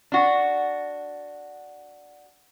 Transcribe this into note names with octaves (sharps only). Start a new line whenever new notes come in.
D4 F#4